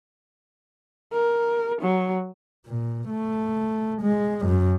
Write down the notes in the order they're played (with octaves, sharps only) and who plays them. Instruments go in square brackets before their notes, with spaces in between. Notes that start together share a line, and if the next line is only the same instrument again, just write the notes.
[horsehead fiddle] A#4
F#3
[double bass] A#2
A3
G#3
F#2